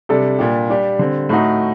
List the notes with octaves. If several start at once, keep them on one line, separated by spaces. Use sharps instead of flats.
C3 G3 D4 A4
A#2 G3 D4 G4
G3 D4 G4
D3 G3 C4
A2 A3 D#4 F#4